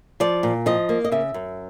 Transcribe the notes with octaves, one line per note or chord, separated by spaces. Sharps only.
F3 D5
A#2
F3 D#5
A#3
D#5
C#3 E5
F#2